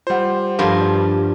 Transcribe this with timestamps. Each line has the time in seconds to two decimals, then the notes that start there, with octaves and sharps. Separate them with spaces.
0.07 G3 F4 C5 F#5
0.59 G2 F3 A#4 F5 B5 C6
0.81 D5